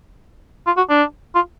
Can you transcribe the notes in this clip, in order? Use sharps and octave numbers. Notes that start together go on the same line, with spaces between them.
F4
F#4
D4
F4